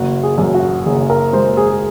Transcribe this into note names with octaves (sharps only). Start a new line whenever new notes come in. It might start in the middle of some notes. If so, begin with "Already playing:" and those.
Already playing: F#1 F#4
G#4
F#2
F#4
F#1 G#4
A#4
G#3 C5
G#4